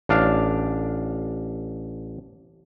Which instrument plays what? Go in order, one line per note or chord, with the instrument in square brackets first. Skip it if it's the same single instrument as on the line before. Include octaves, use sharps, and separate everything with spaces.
[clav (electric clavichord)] A1 D4 F5